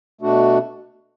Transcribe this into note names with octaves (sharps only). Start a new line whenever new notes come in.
B2 A3 D4 F#4